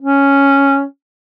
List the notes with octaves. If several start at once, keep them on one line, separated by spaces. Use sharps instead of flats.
C#4